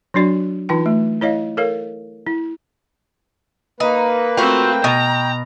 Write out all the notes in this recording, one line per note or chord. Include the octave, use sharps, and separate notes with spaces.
F#3 D4 F#4 D5
E3 D#4 F4 G5
A3
E4 C#5 D#5 F5
A4 A#4 C#5 F5
E4
A#3 D#4 B4
A3 C4 F4 F#4 G5
B2 A#5